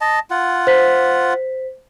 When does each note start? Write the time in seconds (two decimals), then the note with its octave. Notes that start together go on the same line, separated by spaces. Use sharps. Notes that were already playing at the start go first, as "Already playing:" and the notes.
0.01 D#5 A5
0.31 F4 F#5
0.67 C5 B6